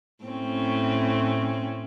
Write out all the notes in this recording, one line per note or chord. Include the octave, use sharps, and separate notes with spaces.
A2 C4 C#4